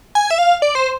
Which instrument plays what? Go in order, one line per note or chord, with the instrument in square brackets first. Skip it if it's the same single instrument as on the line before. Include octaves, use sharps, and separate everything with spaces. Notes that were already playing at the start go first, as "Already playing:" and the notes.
[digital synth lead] G#5
E5
F5
D5
C5